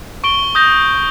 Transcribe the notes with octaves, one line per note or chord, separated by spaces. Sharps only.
C#6 D7 G7
D#6 G6 A#6